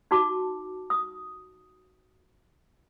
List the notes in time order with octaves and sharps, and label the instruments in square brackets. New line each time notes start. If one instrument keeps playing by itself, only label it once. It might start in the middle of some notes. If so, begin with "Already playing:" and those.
[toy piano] D#4 F#4 A5 D6
D#6